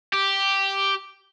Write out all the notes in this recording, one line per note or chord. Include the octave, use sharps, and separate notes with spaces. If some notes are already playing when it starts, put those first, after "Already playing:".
G4